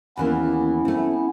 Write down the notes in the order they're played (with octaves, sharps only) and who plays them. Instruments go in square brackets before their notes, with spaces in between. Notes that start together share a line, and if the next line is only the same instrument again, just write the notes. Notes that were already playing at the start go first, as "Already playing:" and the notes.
[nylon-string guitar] D#2 E3 A#3 [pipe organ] B3 C#4 E4
[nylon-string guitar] A3 C4